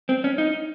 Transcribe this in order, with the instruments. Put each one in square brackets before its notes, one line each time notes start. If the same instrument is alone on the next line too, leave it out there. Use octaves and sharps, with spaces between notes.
[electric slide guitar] C4
C#4
D#4